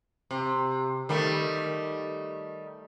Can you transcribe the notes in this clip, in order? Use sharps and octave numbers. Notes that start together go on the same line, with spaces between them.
C3
D#3 G3 A3